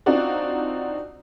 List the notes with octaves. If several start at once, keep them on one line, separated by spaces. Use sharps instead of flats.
C4 D4 D#4 F4 F#4 D5